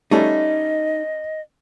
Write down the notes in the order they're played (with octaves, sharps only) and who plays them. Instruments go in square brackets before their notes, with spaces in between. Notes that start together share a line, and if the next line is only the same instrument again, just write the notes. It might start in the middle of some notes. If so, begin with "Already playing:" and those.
[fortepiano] G3 A3 C#4 [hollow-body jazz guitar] D#4 [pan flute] D#5